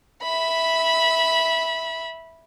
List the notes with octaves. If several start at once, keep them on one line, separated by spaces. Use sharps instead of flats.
E5 B5